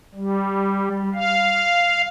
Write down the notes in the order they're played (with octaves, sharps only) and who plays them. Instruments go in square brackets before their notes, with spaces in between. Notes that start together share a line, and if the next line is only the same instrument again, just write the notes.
[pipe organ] G3
F5